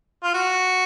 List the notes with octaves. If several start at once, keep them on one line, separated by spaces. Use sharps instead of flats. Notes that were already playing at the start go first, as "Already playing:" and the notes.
F4
F#4